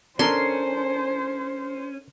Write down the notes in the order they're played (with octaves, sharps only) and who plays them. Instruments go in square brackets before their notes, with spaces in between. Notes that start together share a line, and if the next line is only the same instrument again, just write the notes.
[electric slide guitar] C#4 [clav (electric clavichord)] D4 A4 A#4 [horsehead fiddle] C5 [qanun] C6